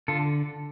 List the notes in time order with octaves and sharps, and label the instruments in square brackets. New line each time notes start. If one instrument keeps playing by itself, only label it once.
[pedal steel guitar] D3 F4 A4